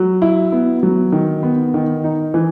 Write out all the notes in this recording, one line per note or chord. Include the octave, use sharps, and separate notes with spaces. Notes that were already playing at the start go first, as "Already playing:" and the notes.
Already playing: F#3
E4
B3
F#3
D#3
B3
D#3
D#4
E3